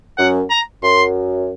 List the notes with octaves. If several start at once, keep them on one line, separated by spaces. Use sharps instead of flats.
F#2 F#5
A#5
F#2 C6